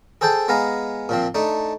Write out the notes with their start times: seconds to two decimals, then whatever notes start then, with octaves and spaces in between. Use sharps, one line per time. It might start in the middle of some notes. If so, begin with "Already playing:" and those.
0.21 G#4 A4 C5 G5 A5
0.48 G#3 B3 F5 G#5 A#5
1.09 A#2 F3 C4
1.35 A3 D4 D#4